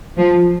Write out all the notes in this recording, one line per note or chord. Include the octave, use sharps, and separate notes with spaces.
F3